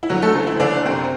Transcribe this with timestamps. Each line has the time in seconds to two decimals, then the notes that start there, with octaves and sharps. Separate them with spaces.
0.03 E4
0.09 D3 F#3 F#4
0.22 A3 A4
0.35 F#1
0.47 E3 E4
0.60 F#1 D3 D4
0.85 F#2 C3 C4